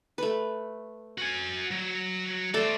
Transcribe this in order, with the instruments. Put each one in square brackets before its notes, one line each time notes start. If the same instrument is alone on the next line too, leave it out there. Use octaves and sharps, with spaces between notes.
[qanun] A3 B4
[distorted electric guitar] F#4 G#5
F#3
[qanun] A3 D5 [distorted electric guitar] A4 C5